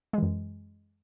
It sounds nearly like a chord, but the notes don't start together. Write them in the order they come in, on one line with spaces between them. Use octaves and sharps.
G#3 E3 F#2